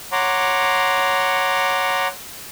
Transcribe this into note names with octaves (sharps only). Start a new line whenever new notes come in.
C#5 F#5 A#5 C6 D6